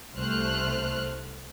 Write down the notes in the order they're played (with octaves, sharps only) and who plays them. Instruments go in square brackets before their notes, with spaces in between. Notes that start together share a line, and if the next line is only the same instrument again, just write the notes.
[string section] C2 A3 C5 F6 F#6